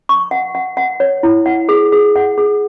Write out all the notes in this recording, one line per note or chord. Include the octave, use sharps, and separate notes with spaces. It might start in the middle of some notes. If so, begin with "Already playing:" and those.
C#6
F#5
F#5
F#5
C#5
E4
F#5
G#4
G#4
F#5
G#4